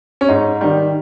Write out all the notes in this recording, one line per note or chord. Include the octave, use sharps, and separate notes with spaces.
C#4
G#2 D#4
D#3 G3